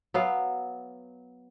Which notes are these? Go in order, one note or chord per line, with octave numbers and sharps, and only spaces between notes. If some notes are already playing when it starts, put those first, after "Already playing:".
F#3 B3 F5